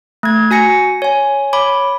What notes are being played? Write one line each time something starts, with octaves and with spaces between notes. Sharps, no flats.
A3 G#6
F#4 G#5 A#6 C#7
C#5 G#5
C#5 B5 D6